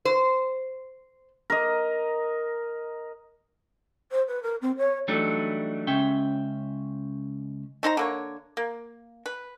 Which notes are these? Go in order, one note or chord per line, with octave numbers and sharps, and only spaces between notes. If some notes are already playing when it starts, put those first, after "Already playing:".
C5
A#4 D#5
C5
B4
A#4
C4
C#5
E3 F#3 G3 A3 D4 D#4
C#2 C#4 E5 G5
A3 D#4 C5 A#5
D3 A#3 C#5
A#3
B4